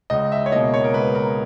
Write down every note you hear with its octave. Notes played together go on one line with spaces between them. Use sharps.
C#2 D#5
E5
C#5
B2 A#3 D#5
C#5
A#4
C#2 B4
A#4